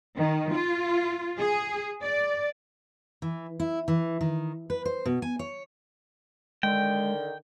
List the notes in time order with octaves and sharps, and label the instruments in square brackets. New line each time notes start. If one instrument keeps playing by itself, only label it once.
[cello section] D#3
F4
G#4
D5
[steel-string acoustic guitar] E3
E4
E3
D#3
B4
C5
B2
G#5
C#5
[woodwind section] D3 D#3 [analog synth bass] G#3 [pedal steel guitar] G5